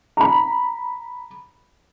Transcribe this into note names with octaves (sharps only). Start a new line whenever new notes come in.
A#5 B5